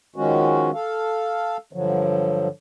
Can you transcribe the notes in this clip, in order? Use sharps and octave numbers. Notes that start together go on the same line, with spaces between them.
D#3 F3 G#3 C#4 F#4
A4 F5
G2 D3 F3 F#3